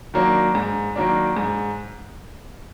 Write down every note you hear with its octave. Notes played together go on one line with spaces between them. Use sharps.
D#3 F#3 A#3 D4
G#2
D#3 F#3 A#3 D4
G#2